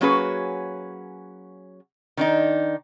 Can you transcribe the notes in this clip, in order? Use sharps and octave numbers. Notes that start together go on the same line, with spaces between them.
F#3 A#3 C#4 F#4 G#4 B4
D#3 D4 D#4